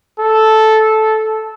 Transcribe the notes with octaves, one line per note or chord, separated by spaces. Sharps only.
A4